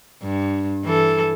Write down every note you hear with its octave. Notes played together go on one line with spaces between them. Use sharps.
G2
E3 A4